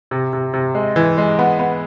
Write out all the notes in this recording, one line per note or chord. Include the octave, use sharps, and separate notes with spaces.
C3
C3
C3
G#3
E3
G#3
B3
B3